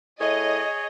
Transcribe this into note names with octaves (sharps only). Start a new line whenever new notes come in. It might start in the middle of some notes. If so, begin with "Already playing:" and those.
A2 G#4 C#5 D#5